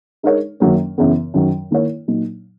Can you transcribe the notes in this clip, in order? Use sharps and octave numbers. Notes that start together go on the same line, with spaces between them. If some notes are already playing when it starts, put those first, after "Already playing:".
G#3 D#4 A#4 C#5
F#2 D#3 F#3 A#3 C#4
F#2 C#3 E3 B3
F#2 D#3 F#3
D#3 A#3 E4 A#4 C#5
A#2 F#3 A#3 D#4